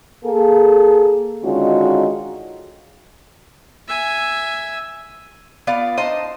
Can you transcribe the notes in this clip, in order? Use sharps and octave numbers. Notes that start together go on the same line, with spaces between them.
A#3 G#4 A4
D3 D#3 G#3 C#4 F4 F#4
E5 G#5
B3 F4 D5
D4 D#4 C5 D#5